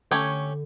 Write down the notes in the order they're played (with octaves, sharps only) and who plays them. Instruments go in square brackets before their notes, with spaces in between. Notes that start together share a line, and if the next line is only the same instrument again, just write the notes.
[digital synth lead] D3 [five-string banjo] A3 C#4 G4 C#5